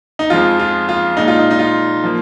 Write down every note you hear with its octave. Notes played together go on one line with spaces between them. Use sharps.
D#4
F2 F3 G#3 F4
F4
F4
A#2 G#3 D#4
F4
D#4
D#4
F4
F3 A#3